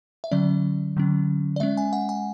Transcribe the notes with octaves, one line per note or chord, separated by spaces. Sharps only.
E5
D3 F#3 C#4 D5
D3 F#3 C#4
D5
G#3 C#4 E5
G#5
F#5
G#5